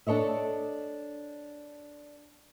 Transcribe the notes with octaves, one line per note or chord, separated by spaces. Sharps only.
D4 A4 C#5 D#5 E5